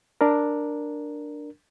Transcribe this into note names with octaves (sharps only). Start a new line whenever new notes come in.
D4 A#4